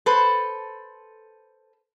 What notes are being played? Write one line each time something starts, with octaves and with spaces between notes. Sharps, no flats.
A4 B4 C5